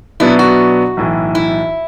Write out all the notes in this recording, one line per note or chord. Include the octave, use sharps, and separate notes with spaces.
B2 F#3 B3 D4 E4
F#4
B1 A2 E3
E4